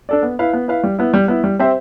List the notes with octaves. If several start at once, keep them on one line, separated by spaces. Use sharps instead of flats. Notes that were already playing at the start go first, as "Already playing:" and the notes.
D4 A4 D5
B3
E4 B4 F5
B3
E4 B4 F5
G3
B3 E4
G3
B3 E4
G3
C4 G4 C5 E5